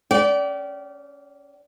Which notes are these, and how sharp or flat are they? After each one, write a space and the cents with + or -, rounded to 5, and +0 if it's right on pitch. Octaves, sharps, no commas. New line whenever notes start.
C#4 +5 D5 -25 G5 -35